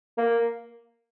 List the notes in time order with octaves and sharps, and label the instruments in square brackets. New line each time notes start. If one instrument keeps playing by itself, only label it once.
[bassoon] A#3